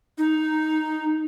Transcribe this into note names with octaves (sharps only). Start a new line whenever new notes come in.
D#4